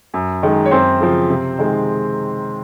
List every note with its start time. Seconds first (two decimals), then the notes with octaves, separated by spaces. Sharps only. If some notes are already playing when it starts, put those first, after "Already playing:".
0.14 F#2
0.43 D#3 G#3
0.65 C#5
0.71 F#2 C4 C5
1.00 C#3 F3
1.30 C3
1.59 D#3 G#3